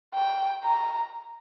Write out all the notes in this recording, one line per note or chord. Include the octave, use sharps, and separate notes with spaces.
G5
A#5